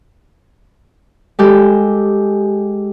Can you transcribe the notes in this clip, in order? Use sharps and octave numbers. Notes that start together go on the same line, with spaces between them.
G#3 G4 A4